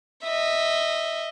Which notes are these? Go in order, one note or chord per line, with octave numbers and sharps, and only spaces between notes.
D#5 E5